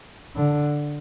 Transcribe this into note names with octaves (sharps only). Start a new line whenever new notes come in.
D3